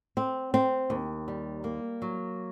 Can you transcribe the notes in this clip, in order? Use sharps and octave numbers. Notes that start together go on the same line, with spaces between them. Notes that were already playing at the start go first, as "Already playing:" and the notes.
C4
C4
D#2
G3
A#3
F#3